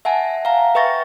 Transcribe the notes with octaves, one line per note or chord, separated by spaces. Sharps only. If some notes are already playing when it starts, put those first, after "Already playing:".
E5 F#5 G#5 A5
F5 F#5 A#5
B4 E5 G5 C#6 A6 A#6